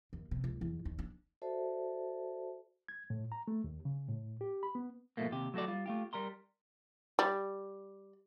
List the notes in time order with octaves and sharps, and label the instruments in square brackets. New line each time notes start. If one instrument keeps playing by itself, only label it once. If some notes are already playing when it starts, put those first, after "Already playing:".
[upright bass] D#2
C3
C#2
E2
D#2
D4
[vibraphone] F#4 A4 C5 D5 E5 A5
[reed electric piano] G#6
A2
A#5
A3
D#2
C#3
A2
G4
B5
B3
[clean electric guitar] G#2 B2 D3 F3 A3 A#3
D#2 C3 G4
F#3 A3 F#4 A4 D5
G3 F4
A3 F4 G4
G3 A#4 A#5 C6
[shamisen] G3